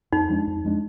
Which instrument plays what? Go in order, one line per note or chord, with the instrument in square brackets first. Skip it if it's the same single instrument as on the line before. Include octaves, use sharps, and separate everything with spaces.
[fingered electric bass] F2 [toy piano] D#4
[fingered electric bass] F3 G#3 D4
F2
F3 G#3 D4